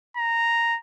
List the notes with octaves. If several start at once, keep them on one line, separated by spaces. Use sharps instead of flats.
A#5